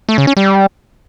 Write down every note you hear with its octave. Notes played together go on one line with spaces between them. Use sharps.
A3
C#3
C#4
G3